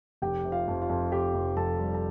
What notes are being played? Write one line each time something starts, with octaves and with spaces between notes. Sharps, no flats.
F1 G4 G5
C3
F4 F5
F2
F4 F5
F2
F2 G4 G5
F1
F2 A4 A5
G3
A5